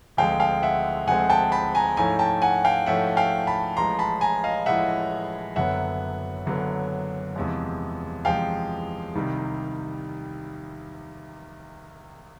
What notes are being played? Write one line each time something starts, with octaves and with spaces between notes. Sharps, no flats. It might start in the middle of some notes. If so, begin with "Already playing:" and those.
D2 D3 F3 G#3 C4 F5 G5
F5 G5
E5 F#5
D2 D3 F3 G#3 C4 F#5 G#5
G5 A5
A5 B5
G#5 A#5
G#2 F3 A3 C#4 E4 G#5 A#5
G5 A5
F#5 G#5
F5 G5
G#2 F3 A3 C#4 E4 E5 F#5
F5 G5
A5 B5
A1 A2 F3 G#3 A#5 C6
A5 B5
G#5 A#5
D#5 F5
A1 A2 F3 G#3 E5 F#5
F#1 F#2 D3 F#3 B3 E5 F#5
F#1 F#2 D3 F#3 B3
E2 C3 F3 G#3
E2 C3 F3 G#3 F5 G5
C2 C3 D#3 G3